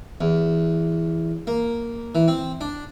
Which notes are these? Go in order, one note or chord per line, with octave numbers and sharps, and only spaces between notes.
E2
A#3
E3
C4
D4